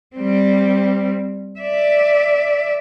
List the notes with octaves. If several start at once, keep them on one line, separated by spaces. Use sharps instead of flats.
G3 C4
D5 E5